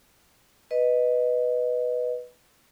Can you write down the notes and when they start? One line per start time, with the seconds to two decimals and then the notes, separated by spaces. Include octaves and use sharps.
0.71 B4 D#5